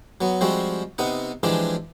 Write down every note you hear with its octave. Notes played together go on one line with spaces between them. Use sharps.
F#3 B3
F3 G3 G#3 C4 F#4
C3 B3 D#4 F#5
E3 F3 G#3 D4 G4